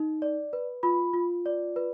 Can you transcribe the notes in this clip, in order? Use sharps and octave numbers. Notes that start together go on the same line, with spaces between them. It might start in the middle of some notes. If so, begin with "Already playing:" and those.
Already playing: D#4
D5
B4
F4 B5
F4
D5
B4